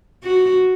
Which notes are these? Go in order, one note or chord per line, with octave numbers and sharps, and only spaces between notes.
F#4